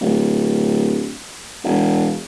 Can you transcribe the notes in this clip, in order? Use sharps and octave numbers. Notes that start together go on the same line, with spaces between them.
D1
E1